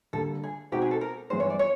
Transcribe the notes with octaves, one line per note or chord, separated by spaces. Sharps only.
D3 G3 A#3 A4
G#4
B2 G#3 C4 D#4 F#4 G4
G#4
A4
A#4
G2 E3 G#3 B3 C5
C#5
D5
C#5